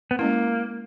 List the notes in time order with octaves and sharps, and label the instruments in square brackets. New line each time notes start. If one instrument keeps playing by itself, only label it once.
[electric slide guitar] B3
[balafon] G#3 C#4 E4 [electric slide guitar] A#3